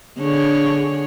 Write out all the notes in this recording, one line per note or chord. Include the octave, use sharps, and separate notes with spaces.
D3 G#4 C#5